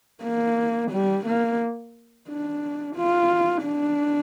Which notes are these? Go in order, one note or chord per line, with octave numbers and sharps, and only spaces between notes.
A#3
G3
A#3
D4
F4
D4